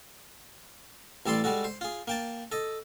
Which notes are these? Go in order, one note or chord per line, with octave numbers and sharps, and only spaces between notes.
A1 G3 A4 D5 A5 C6
G3 G#3 F#4 A4
C5
F4 G#4
A#3 G5 A5
A4 D#5